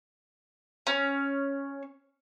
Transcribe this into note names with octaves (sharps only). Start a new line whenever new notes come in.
C#4